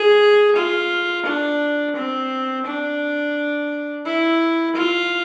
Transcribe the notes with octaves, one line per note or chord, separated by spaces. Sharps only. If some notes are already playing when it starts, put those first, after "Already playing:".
Already playing: G#4
F4
D4
C4
D4
E4
F4